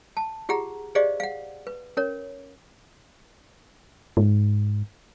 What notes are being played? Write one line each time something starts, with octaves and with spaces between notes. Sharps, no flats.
A5
F4 G4 G#4 F#5 A#5
G4 G#4 C5 D5 D#5 F5
F5 F#5
B4
C#4 A#4 C#5
G#2